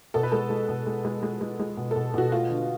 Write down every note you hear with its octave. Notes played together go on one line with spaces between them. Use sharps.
B2 A4
B4
G#3 A4
G#3
B2
G#3
G#3
G#3
G#3
G#3
B2
B2 A4
B2 F#4
A3 F4
D3